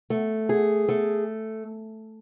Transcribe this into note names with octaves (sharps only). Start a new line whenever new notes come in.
A3
G#4
A3